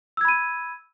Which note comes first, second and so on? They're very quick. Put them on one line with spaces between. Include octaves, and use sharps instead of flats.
E6 G#6 B5 D#7